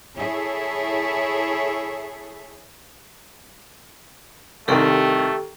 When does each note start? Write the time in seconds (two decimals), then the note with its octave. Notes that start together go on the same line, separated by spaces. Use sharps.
0.17 E4 G#4 A4 C#5 E5
4.68 C2 C3 D#3 A3 G4 A4 G5